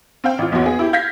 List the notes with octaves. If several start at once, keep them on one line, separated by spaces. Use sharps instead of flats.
C4 F5 G5
A1 F4
B1 E2 B3 F#4 C#5
B3 G#4
E4 G4
F5 G6 G#6 A#6 B6